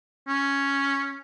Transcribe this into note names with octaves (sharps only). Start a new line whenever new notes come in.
C#4